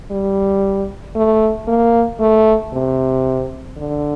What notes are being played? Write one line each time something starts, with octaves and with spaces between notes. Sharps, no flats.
G3
A3
A#3
A3
C3
D3